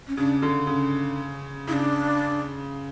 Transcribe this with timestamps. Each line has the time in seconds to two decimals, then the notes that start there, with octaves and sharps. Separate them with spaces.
0.08 C#4
0.17 C#3 D4
0.42 D3
0.67 C#3
1.67 C#3 E4
1.73 D4